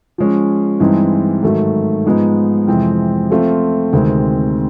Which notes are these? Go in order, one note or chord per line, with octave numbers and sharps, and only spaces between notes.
F3 G#3 C#4
G2 E3 G#3 C4 D#4
G#2 D#3 F#3 A3
G#2 F3 G#3 B3 D#4
F2 C3 E3 G#3 C4
F3 A3 C4 F4
D2 C3 D#3 G#3 C4